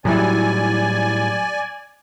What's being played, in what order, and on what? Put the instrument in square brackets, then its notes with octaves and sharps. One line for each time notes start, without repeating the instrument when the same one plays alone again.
[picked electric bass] A2 G3 [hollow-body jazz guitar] F#3 E4 [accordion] D5 G#5